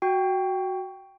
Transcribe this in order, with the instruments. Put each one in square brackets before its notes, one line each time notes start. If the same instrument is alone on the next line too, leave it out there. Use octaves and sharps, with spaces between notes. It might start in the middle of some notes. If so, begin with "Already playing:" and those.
[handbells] F#4 G5